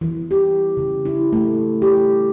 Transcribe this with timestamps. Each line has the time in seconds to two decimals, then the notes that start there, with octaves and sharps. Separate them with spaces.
0.01 E3
0.31 G4
0.77 C#3
1.05 E4
1.33 A3
1.82 G4